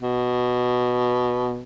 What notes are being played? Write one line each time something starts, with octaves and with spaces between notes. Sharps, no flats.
B2